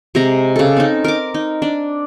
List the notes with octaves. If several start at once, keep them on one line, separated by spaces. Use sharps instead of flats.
C3 G#3 A#5
C#3 A4
C4 C#4 D#4
A#4 D6
D#4
D4